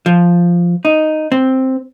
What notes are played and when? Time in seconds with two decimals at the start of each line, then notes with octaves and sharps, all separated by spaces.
0.06 F3
0.85 D#4
1.32 C4